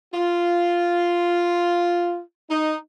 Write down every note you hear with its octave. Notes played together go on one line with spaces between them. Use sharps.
F4
D#4